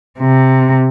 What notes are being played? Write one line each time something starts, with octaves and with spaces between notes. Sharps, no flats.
C3